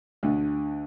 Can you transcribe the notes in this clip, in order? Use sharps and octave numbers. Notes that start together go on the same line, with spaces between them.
D2 D3